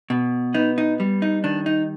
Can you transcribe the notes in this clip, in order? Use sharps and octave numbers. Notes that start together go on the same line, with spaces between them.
B2
B3 D#4
D#4
G3
D#4
D#3 D4
D#4